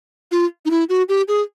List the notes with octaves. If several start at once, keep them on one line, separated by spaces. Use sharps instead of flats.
F4
D#4
E4
F#4
G4
G#4